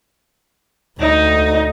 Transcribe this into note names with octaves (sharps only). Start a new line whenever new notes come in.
D2 D#4